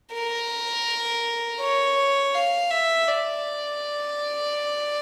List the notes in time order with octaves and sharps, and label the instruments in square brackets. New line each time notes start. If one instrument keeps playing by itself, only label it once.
[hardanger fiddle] A#4
C#5
F5
E5
D5